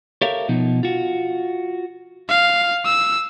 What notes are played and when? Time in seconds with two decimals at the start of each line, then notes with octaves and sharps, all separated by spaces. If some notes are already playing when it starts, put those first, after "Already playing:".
0.22 G4 A4 A#4 C#5 E5 F5
0.49 B2 F3 D#4
0.83 F4 F#4
2.29 F5
2.85 E6